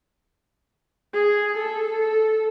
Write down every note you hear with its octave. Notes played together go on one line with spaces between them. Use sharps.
G#4
A4